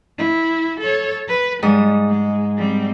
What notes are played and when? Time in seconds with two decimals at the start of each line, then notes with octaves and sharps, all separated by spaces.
0.18 E4
0.80 A4 C#5
1.28 B4
1.63 G#2 G3 D#6
2.09 G#3
2.57 G3 C4